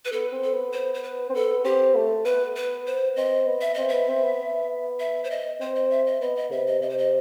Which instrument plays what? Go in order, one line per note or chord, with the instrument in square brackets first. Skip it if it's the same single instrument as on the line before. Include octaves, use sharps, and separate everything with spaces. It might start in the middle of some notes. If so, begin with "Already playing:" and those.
[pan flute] B4
[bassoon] B3 [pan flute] A4
[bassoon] C4
[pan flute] A4
[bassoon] B3
[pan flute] C5
C5
B4
[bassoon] C4
[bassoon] B3 [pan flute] A4
[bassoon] C4 [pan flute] G4
[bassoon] A3
[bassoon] B3 [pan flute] B4
[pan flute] B4
C5
[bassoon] C4 [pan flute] D#5
[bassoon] B3
[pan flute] E5
[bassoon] C4 [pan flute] D#5
[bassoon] B3 [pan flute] E5
[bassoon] C4
B3
[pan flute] E5
C5
D#5
[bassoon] C4 [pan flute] C5
[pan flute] D#5
E5
D#5
[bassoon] B3 [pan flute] D#5
[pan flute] D#5
[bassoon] C3 [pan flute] E5
[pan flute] D#5
[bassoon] C3 [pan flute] D#5
[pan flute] C5
D#5